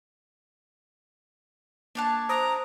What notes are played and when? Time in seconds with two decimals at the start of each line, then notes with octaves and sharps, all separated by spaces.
1.95 A#3 D4 C#5 A5 D6 F#6
2.29 C5 A#5 D#6 D7